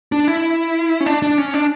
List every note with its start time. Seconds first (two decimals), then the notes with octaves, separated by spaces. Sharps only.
0.12 D4
0.28 E4
1.00 C#4
1.06 D4
1.22 D4
1.38 C#4
1.54 D4